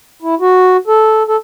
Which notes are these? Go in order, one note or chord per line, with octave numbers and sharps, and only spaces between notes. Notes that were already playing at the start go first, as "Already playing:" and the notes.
E4
F#4
A4
A4